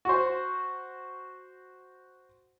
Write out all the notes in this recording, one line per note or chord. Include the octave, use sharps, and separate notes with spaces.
F#4 C5